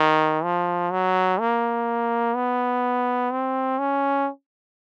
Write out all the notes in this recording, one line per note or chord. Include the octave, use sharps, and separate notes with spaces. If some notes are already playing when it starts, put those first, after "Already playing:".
Already playing: D#3
F3
F#3
A#3
B3
C4
C#4